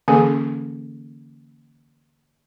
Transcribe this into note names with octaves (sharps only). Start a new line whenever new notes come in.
D3 E3 A#3 C#4 G#4 G#5